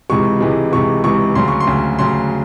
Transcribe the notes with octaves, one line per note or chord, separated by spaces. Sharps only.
C#2 C3 E3 G#3 C#6
C#2 C3 E3 G#3
C#2 C3 E3 G#3 C#6
C#2 C3 E3 G#3 C#6
D2 C#3 F#3 C6
C#6
C6
D2 C#3 F#3
D2 C#3 F#3 C6